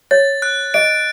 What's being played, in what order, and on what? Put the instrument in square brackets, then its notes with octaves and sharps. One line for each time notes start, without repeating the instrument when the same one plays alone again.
[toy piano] C#5 [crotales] A6
[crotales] F#6
[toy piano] D#5 [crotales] D7